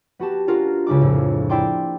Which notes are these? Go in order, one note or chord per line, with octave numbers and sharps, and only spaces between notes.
B3 F#4 G4 A5
C#4 D4 F4 F#4 A#4
C#2 C#3 D4 D6
F2 A2
A#3 E4 D5 G5 C6 D6